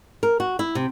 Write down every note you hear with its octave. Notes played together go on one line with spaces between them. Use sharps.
A#4
F#4
E4
C3